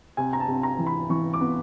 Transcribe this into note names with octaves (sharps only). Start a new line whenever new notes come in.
C3 G#5
A#5
A5
C3
A#5
E3
B5
E3 C#6
D6
B3